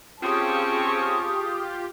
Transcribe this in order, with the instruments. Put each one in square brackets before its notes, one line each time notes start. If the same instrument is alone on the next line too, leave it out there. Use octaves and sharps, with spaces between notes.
[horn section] C4 C#4 [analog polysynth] F4 G4 [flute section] G#4 D#6 [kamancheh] A5 C#6